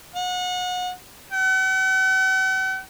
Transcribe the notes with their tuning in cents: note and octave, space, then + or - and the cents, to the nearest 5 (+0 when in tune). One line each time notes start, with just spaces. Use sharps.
F#5 -30
F#5 +45